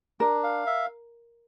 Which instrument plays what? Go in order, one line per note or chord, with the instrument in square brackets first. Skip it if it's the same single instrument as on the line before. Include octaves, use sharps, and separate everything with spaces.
[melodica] D4 [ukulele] A#4
[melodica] F5
E5